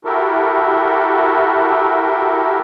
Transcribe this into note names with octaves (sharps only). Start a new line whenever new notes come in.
E4 F#4 G4 A4 A#4